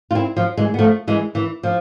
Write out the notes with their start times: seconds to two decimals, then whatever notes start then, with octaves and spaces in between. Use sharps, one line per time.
0.11 F4
0.15 C4 E4
0.37 F3
0.57 E3 G#3
0.74 B3
0.79 F3 A3
1.07 E3 G#3
1.35 E3
1.63 F3